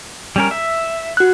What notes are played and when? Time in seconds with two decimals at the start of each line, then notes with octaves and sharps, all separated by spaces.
0.36 G3 C#4 A#4
0.51 E5
1.17 F#4 F#6